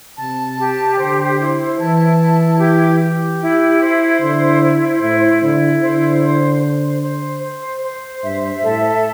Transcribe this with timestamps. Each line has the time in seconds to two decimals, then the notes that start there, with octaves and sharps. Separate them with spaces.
0.18 C3 A5
0.58 G4
0.99 D3 C5
1.40 E4
1.80 E3 A5
2.19 E4
2.59 G4
3.00 G4
3.41 E4
3.81 C5
4.21 D3 E4
4.62 C5
5.01 A2 E4
5.41 D3 E4
5.82 D3 C5
6.22 C5
6.63 C5
7.02 C5
7.43 C5
7.83 C5
8.24 G2 E5
8.64 A2 A4